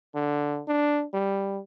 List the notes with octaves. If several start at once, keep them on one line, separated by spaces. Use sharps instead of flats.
D3
D4
G3